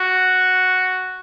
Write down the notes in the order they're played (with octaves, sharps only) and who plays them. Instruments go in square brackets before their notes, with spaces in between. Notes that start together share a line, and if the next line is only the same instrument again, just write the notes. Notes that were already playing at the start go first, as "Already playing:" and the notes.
Already playing: [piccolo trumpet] F#4